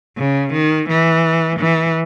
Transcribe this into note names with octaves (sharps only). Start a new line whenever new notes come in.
C#3
D#3
E3
E3